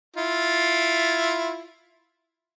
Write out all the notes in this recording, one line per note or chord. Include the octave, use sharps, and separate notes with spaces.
E4 F4